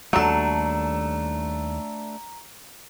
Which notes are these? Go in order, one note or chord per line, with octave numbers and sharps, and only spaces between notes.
D#2 F#3 G3 A3 D4 A4 A#5